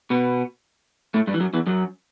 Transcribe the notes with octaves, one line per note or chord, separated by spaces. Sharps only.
B2 B3
A2 A3
G2 G3
E3
F#2 F#3
E2 E3
F#2 F#3